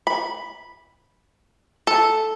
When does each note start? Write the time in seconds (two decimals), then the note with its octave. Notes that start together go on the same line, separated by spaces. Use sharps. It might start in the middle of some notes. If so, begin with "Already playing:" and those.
0.07 B5
1.87 A4